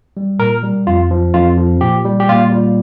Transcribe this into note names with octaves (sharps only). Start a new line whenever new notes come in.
G3
A#2 A#4
G3
F2 F4
F3
F2 F4
F3
A#2 G4
G3
G4
A#2 F4
G3